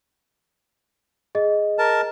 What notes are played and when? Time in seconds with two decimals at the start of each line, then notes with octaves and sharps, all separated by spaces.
1.35 G#4 D#5
1.79 A#4 A5